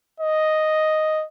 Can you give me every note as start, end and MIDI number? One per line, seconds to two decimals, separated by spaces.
0.20 1.24 75